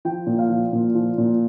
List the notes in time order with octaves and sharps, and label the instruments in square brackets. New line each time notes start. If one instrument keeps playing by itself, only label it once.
[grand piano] F3 G5
A#2
F5
F3
A#2
F3
A#2